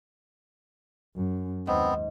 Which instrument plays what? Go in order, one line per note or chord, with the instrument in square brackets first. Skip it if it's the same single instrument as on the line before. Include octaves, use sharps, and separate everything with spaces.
[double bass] F#2
[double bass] D#2 [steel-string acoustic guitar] G#2 [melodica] B3 C4